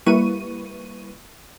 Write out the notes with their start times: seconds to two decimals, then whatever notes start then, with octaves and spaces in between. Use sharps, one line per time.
0.06 G3 A#3 E4 B4 C#6 D#7